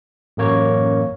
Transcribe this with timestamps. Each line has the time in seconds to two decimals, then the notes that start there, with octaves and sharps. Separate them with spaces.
0.37 A1 F#2 A#3 C#5